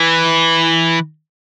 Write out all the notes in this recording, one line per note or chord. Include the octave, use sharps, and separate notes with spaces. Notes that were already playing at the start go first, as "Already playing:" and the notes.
Already playing: E3